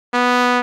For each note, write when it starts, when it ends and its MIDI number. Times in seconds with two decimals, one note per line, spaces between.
0.14 0.61 59